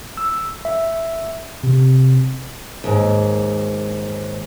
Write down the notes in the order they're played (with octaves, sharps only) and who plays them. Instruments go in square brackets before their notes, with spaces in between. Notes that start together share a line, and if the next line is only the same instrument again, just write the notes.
[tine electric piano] E6
E5
C3
[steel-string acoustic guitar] D#2 G#2